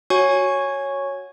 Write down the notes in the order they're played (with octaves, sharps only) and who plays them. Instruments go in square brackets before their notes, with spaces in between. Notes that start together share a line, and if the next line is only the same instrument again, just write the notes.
[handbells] F#4 C#5 G#5 C#6